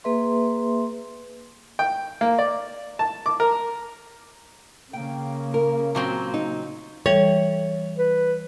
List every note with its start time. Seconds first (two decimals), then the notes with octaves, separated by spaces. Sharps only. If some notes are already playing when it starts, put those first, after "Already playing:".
0.04 A#3 G#4 B4 E5 C6
1.79 G5
2.21 A#3
2.39 D5
2.99 A5
3.26 D6
3.40 A#4
4.93 C#3 A#3 G5
5.54 A#4
5.95 A#2 F#3 C4
6.34 D#4
7.06 E3 G3 A4 C#5
7.97 B4